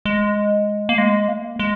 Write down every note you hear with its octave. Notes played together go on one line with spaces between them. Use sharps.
G#3
A#3
G#3
A#3
G#3